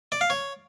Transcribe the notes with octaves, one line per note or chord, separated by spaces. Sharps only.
D5
F5
C#5